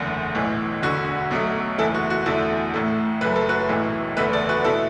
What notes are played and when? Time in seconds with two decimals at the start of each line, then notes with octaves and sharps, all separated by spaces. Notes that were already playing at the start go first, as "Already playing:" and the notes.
Already playing: F#1 E2 D3 A3
0.35 B1 A2 E3
0.83 E1 D2 D3 F#4
1.31 B1 B2 F#3 A3
1.78 F#1 E2 E3 A3 E4 A4
1.94 F#4
2.10 F#4
2.26 E2 D3 A3 E4 A4
2.74 A1 A2 A3
3.21 F#1 F#2 F#3 A3 B4
3.36 A4
3.49 F#4 B4
3.69 B1 A2 E3 A3
4.17 F#1 E2 D3 A3 B4 E5
4.33 A4 D5
4.49 F#4 B4
4.65 B2 A3 E4 A4